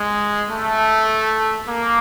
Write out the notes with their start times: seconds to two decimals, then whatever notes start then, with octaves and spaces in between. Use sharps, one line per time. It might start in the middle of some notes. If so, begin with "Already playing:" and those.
Already playing: G#3
0.50 A3
1.69 A#3